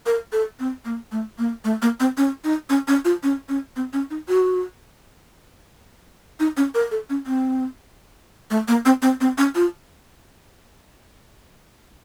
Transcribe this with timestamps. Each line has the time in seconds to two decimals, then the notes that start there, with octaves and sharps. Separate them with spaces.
0.06 A#4
0.32 A4
0.60 C4
0.85 A#3
1.12 A3
1.38 A#3
1.64 A3
1.82 A#3
2.00 C4
2.17 C#4
2.44 D#4
2.70 C#4
2.88 C#4
3.05 F4
3.23 C#4
3.49 C#4
3.76 C4
3.93 C#4
4.10 D#4
4.28 F#4
6.40 D#4
6.57 C#4
6.74 A#4
6.91 A4
7.10 C#4
7.27 C4
8.51 A3
8.68 A#3
8.86 C4
9.02 C4
9.21 C4
9.38 C#4
9.55 F4